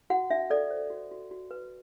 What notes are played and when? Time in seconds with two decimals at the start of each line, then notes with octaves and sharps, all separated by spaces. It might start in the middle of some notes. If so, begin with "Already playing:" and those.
0.10 F#4 F#5
0.30 D4 E5
0.50 A4 D5
0.71 C5
0.90 F#4
1.11 F#4
1.31 F#4
1.51 B4